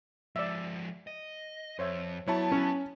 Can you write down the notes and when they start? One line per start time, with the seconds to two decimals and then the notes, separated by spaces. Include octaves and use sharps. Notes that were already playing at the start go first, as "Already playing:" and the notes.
0.36 F3 G#3 D5 E5
1.07 D#5
1.79 F2 C5 C#5 E5
2.28 F#3 B3 E4 C#5 A5
2.52 C#4